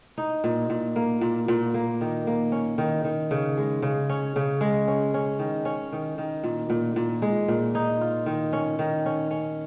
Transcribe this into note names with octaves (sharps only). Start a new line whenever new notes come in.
D#4
A#2
A#2
A#3
A#2
A#2
A#3
D#3
A#3
C#4
D#3
D#3
C#3
G#3
C#3
C#4
C#3
G#3
C#4
C#4
D#3
C#4
D#3
D#3
A#2
A#2
A#2
G#3
A#2
D#4
F4
D#3
C#4
D#3
C#4
C#4